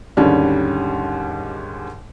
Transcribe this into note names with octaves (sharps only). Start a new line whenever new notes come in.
D#2 G#2 D3 G3 C#4 D4